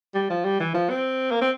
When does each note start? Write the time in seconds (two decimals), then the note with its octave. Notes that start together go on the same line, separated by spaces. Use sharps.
0.14 G3
0.30 F3
0.45 G3
0.60 E3
0.74 F3
0.90 C4
1.31 A#3
1.41 C4